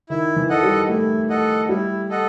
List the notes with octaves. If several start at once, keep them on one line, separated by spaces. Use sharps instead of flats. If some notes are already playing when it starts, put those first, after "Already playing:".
D#3 E4
E3
A4 D#5 F#5
G3
A3 E4
A4 D#5 F#5
G3 E4
A4 D#5 F#5